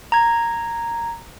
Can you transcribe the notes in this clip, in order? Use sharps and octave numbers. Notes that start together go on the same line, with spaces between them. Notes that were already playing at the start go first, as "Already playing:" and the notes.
A#5 G#6